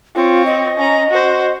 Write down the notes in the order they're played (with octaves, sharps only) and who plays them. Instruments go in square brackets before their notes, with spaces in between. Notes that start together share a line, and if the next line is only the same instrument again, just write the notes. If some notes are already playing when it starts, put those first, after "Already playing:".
[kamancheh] C4 C#5 [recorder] F4
[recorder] D#5
[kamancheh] C#4 A#5
F#4 C5